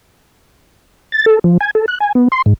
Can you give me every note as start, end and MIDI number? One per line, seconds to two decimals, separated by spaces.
1.12 1.25 93
1.26 1.39 69
1.44 1.57 53
1.61 1.71 80
1.75 1.85 69
1.88 1.98 90
2.00 2.12 80
2.15 2.28 59
2.32 2.42 84
2.46 2.54 44